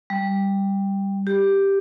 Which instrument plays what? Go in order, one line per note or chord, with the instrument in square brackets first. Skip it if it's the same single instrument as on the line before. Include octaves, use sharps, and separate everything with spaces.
[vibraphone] G3
G4